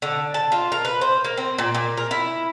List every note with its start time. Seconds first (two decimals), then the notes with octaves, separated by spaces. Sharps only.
0.02 D3
0.34 A5
0.52 F4
0.72 A#4
0.85 B4
1.01 C5
1.24 A#3
1.37 C4
1.58 A#2
1.75 A#2
1.97 A#4
2.11 E4